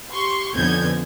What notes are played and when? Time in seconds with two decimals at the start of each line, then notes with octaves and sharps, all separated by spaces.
0.13 G4 C6 C#6
0.54 F2 D3 B3 C#4 G6 G#6